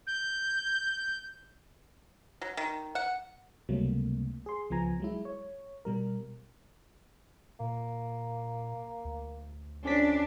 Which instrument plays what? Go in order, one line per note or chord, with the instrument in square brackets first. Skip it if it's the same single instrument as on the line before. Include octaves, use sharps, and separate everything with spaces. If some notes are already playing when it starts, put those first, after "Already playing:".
[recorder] G6
[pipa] F#3
D#3
F#5
[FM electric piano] C#2 C3 F#3 G3 A3 A#3
G#4 C6
C#2 F3 B3 G#5 A#5
F#3 G#3 E4
C#5
B2 G3 A#4
[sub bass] A#2 [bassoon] A#3
[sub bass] D2
[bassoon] F2 [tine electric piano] C#4 B6 [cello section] D4